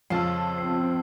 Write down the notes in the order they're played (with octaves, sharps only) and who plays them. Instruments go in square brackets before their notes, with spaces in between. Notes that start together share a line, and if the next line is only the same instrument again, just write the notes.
[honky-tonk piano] F2 A5 [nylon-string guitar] C#3 F3 F4 [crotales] E6 F6 C7
[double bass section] C4 [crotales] C7